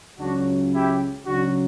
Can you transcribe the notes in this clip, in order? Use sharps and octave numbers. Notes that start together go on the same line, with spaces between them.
C#2 C#3 F#3 D4 F#4
E4 G4
C#2 C#3 F#3 D4 F#4